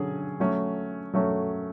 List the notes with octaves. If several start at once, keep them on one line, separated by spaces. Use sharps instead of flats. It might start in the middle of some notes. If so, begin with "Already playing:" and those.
Already playing: D3 F#3 C#4 G#4
F#3 A3 C#4
F#3 A3 C#4